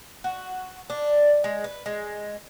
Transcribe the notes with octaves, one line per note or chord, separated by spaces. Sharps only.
F#4
D4
G#3
B4
G#3